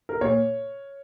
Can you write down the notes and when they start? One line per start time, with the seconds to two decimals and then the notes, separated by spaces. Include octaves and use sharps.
0.09 A#4
0.21 A#2 C#5